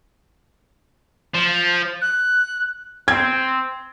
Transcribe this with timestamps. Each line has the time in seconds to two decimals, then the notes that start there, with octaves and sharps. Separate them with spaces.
1.34 F3
2.01 F#6
3.08 C4 G#6